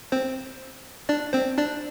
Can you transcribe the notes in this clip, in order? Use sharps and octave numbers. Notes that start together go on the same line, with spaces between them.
C4 C5
D4 D5
C4 C5
D4 D5